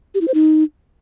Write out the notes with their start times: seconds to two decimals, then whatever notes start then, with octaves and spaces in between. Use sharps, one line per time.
0.14 G4
0.21 E4
0.28 C5
0.34 D#4